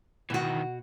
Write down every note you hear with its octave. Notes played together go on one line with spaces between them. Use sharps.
B2 D#3 E3 F#4